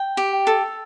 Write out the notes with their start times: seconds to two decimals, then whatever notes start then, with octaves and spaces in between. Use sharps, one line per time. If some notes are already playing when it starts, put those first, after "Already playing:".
Already playing: G5
0.17 G4
0.47 A4